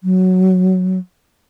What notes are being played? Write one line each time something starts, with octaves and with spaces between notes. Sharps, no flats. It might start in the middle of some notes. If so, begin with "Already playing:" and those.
F#3